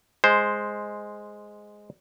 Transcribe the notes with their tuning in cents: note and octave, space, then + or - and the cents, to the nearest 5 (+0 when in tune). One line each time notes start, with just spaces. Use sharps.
G#3 +0 C5 +0